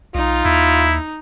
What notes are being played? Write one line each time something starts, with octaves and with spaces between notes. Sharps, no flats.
B1 D#4 F4
D#2 E4